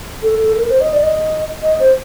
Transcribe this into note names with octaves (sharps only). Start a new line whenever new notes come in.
A4
A4
A#4
C5
D#5
D5
D#5
D#5
C5